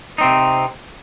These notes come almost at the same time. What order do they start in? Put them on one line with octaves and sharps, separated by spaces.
D#4 C4 C3